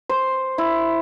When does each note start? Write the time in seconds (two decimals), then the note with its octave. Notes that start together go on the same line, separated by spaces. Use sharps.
0.09 C5
0.58 E4